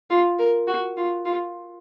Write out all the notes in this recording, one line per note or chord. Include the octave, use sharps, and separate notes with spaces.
F4
A#4
F#4
F4
F4